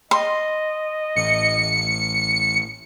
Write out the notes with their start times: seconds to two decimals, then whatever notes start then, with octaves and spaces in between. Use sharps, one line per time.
0.11 D#5 C6
1.16 A1 C#7